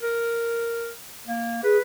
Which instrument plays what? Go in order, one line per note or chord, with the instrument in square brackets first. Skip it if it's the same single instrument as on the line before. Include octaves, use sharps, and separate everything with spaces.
[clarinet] A#4
A#3
[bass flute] G#4 [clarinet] B4